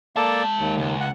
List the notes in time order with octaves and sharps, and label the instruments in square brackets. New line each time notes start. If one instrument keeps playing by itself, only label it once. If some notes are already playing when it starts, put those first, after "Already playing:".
[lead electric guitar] G#3 A5 [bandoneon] A#3 A4 D5
[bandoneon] D#2
[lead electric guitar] C#2
[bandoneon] F#5